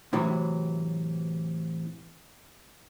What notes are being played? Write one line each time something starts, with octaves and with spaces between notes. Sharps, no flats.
A2 C3 E3 F#3